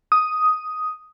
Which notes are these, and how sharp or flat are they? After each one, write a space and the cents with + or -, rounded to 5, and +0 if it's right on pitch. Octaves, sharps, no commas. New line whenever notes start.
D#6 +5